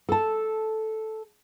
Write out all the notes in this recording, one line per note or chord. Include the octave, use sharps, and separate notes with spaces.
A4 A5